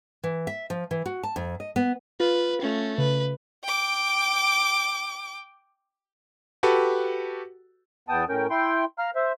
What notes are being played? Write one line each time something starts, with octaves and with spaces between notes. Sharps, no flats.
E3
E5
F3
E3
F#4
A5
F2
D#5
B3
F4 B4
A3 C#4
C#3 B4
G5 D6
F#4 G4 A4 B4
E2 B3 G5 A5 D#6
A2 C#4 A#4 G5
E4 G5 C6
F5 A#5 F6
C5 E5